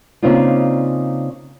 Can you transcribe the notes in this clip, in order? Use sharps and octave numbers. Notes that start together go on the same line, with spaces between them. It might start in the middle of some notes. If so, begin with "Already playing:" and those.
C#3 A#3 C4 D4 D#4 F4